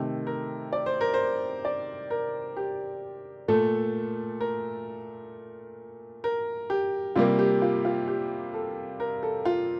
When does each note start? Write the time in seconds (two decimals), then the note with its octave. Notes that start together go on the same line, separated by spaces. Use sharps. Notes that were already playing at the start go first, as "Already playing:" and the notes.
Already playing: C3 D#3 A3 A4
0.27 A#4
0.73 D5
0.86 C5
1.01 A#4
1.14 C5
1.65 D5
2.10 A#4
2.57 G4
3.48 A#2 A3 A4
4.41 A#4
6.24 A#4
6.70 G4
7.16 C3 G3 A#3 F4
7.39 G4
7.62 F4
7.85 F4
8.08 G4
8.54 A4
9.00 A#4
9.23 A4
9.45 F4